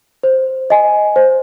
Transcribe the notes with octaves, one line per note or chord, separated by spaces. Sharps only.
C5
D#5 G#5
C5